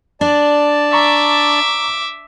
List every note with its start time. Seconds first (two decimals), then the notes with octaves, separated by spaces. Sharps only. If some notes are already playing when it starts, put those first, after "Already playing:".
0.21 D4 D5 A5
0.93 E5 A#5 C#6 D6